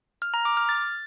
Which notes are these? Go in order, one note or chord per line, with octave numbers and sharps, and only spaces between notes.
F6
A#5
D6
F6
A6